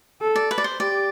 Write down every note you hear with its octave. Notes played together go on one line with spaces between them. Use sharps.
A4
D5
B4
D5
C5
G4 D5